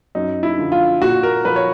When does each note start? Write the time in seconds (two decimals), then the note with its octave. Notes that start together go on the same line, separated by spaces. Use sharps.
0.15 F#2 D#4
0.43 E4
0.58 D3 F3
0.72 F4
1.01 A#2 F#4
1.23 A#4
1.45 F3 B4
1.56 C#5